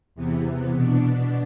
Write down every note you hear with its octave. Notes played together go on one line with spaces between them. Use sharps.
E2 C3 E3 B3
B2 B3 D4